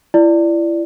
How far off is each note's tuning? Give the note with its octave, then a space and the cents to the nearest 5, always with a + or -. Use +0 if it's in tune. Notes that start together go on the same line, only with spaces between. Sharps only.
E4 +30 D5 +0